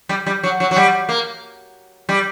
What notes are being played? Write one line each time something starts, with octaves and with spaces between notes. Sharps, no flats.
G3
G3
F#3
F#3
F#3
G3
A#3
G3